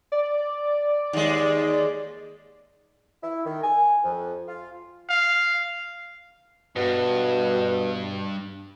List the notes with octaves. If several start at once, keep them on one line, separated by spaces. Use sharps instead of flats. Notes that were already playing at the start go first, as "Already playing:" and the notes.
D5
D#2 G#3
E4
D#3
G#5
F2
F4
F5
G2 B2